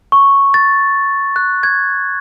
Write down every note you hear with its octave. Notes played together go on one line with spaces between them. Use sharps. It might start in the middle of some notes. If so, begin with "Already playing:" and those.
C#6
A6
F#6
G#6